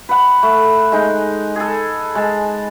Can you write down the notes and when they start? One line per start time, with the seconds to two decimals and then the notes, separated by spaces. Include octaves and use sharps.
0.09 B4 F#5
0.43 A3
0.92 G#3 D#4
1.56 G#4 A4
2.15 G#3 A5